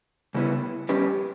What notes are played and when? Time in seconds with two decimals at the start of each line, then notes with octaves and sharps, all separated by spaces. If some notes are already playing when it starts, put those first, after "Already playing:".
0.35 C#3 G3 B3 E4 B4
0.89 G3 C#4 G4 B4